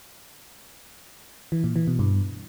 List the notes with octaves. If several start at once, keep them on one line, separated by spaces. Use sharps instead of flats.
E3
A#2
E3
B2
G2